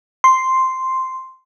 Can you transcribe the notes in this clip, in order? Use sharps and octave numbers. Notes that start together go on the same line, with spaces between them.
C6